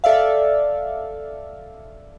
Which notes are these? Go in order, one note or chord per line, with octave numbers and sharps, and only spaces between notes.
A4 D5 E5 F5